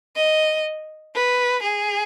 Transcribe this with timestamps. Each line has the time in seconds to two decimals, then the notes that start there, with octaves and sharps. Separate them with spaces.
0.16 D#5
1.15 B4
1.63 G#4